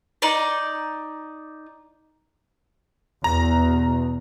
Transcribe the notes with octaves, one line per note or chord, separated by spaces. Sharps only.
D#4 D5
E2 B2 A#5